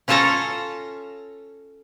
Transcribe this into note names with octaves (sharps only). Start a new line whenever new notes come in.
C#4 F4 A4 C#5 A5 A#5